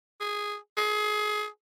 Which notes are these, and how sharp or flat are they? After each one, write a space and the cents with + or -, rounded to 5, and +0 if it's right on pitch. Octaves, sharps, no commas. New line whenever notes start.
G#4 -5
G#4 +25